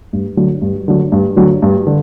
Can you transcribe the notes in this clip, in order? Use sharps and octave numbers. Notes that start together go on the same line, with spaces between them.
G2
D3 F#3
G2
D3 F#3
G2
D3 F#3
G2
D3